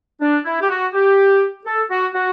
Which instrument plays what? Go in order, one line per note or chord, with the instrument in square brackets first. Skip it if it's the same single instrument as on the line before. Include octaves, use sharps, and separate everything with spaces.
[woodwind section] D4
E4
G4
F#4
G4
A4
F#4
F#4